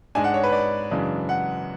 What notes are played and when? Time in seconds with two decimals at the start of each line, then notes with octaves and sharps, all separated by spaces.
0.15 G#2 G#3 D4 G#5
0.24 F#5
0.34 C#5
0.44 B4
0.52 D5
0.91 F#2 C#3 E3 G#3 D4
1.29 F#5